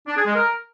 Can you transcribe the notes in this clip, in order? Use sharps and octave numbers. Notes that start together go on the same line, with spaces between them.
D4
G#4
G#3
A#4